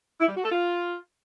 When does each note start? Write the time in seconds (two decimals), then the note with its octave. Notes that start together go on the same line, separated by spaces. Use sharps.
0.20 E4
0.28 G3
0.36 F#4
0.44 A4
0.52 F4